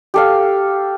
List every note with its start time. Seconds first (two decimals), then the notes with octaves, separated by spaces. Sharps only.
0.14 G4 A4 F5